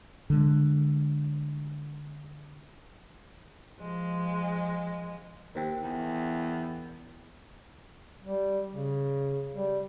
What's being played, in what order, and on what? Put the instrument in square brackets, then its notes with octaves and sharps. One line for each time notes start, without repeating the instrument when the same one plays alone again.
[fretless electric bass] D3 G#3
[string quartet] F3 G#3
[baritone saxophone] D#2 [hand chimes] A#4 C5 G5
[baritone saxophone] E2
[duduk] G3
C#3
G3